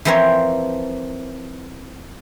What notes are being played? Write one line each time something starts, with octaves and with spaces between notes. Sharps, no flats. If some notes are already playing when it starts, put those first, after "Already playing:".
E3 F3 C4 A#4 C5 C#5